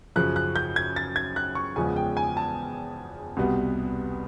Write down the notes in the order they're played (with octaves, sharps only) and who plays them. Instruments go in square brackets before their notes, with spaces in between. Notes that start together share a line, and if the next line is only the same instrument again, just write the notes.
[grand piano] F#2 C#3 F3 F#6
F#6
G6
G#6
A6
G#6
F#6
C#6
E2 C#3 F3 G#3 B3 G#5
G5
G#5
A5
C2 B2 G3 B3